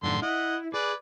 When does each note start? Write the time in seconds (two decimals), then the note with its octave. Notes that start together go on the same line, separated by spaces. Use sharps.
0.03 F#2 A2 D3 D#3 C6
0.22 E4 D#5 F#5
0.74 G#4 B4 D5